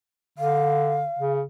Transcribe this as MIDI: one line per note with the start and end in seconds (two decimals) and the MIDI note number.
0.38 1.06 50
0.38 1.34 77
1.19 1.42 49